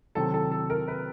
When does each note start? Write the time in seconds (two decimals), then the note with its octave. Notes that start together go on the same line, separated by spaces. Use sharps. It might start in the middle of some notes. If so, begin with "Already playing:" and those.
0.15 C3 D#3 F#3 A4
0.34 A4
0.52 A4
0.70 A#4
0.88 B4